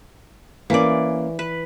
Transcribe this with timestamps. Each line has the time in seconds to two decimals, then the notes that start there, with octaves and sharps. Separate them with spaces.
0.70 E3 A#3 C#4 D5
1.39 B4